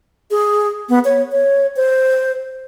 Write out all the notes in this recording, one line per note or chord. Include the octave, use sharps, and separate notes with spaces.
G#4
B3
C#5
C#5
C5